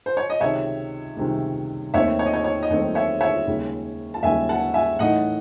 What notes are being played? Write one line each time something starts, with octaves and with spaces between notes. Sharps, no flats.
C5
C#5
D#5
C#2 C3 D#3 C#5 E5
C#2 C3 D#3
D#2 D#3 A3 C4 D#4 C#5 E5
C#5
D#5
C#5
C#5
D#5
D#2 D#3 A3 C4 D#4 C#5
C#5 E5
C#5 E5
D#2 C#3 G#3
A5
D#2 C#3 G#3 E5 G#5
F#5 A5
E5 G#5
A2 E3 A3 D#4 D#5 F#5